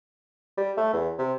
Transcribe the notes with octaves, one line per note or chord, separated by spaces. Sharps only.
G3
A3
E2
C3